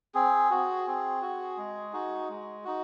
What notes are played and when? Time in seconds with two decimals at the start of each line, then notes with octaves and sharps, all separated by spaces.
0.14 C4 G#4
0.51 F#4
0.87 C4
1.22 F#4
1.57 G#3
1.93 D#4 F#4
2.29 G#3
2.64 D#4 F#4